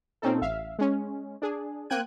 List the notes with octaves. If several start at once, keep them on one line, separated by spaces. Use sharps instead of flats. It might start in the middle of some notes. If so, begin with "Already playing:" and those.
A#2 C4 C#4 D#4 A4
A1 E5 F5
G#3 C#4
D4 G#4
A#3 C4 G5 F#6 G#6 D#7